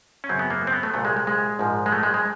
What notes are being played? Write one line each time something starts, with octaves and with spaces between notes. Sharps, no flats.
C#4
G#1 F#2 C#3 F#3 C4
B3
A#3
C4
B3
A3
C2 A#2 F#3 A3
G#3
G#3
G#3
A#1 G#2 F3
G#3
A3
G#3
G#3